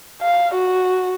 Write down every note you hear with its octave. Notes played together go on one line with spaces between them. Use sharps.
F5
F#4